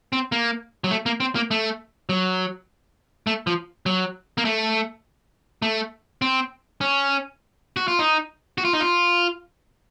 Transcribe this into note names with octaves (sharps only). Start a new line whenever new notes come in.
C4
A#3
F#3
A3
A#3
C4
A#3
A3
F#3
A3
F3
F#3
A#3
A3
A3
C4
C#4
F#4
F4
D#4
F#4
F4
D#4
F4